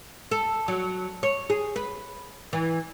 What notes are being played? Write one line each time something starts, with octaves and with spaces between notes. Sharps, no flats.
A4
F#3
C#5
G#4
B4
E3